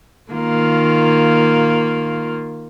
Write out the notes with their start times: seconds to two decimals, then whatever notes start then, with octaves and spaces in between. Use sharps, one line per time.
0.32 D#3 A#3 F4